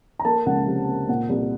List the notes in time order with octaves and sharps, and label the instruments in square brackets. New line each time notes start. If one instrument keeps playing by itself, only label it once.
[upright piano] A#5
A#3 A5
C#2 F#5
C3
A#3
A#2 F#5
C2